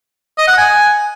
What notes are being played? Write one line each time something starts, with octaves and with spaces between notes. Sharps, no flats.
D#5
F#5
G#5